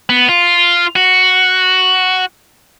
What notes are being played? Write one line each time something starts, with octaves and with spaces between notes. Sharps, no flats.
B3
F4
F#4